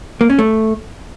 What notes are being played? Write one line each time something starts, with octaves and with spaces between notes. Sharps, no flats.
A#3
C#4
A3